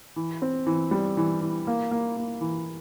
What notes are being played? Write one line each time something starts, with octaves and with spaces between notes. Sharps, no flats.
E3
C4
E3
G3
E3
E3
A#3
A#3
A#3
E3